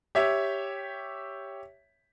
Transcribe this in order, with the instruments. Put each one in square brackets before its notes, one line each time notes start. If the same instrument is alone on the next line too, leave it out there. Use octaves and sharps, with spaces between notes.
[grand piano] G4 C#5 E5